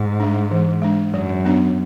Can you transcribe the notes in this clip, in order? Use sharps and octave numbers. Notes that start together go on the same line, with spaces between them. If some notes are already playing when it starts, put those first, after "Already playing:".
Already playing: G#2
G#3 D4
E3
G#3 D4
F#2 F#3
B3 D4